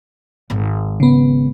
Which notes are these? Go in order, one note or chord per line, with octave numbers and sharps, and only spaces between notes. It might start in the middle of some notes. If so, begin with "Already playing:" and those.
G#1 G#2
C#3 B3